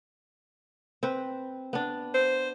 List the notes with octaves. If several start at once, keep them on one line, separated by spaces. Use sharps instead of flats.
C4 B4
B3 D4
C5